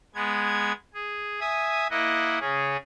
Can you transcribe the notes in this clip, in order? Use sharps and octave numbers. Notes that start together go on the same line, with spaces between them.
G#3 B3 G#6
G#4
E5 G#5 D#6
A#3 E4 D#5 F#5
C#3 C#4 G#4